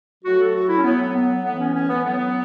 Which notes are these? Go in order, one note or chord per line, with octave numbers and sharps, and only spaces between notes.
A2 F#3 F#4
A4
F#4
E4
C#4
A2 F#3 B3
B3
A2 E3 B3
C#4
C#4
B3
A2 F#3 B3